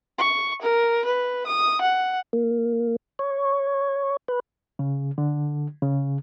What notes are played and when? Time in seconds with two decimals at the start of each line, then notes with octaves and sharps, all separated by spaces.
0.19 C#6
0.62 A#4
1.05 B4
1.47 D#6
1.81 F#5
2.33 A#3
3.19 C#5
4.28 B4
4.79 C#3
5.18 D3
5.82 C#3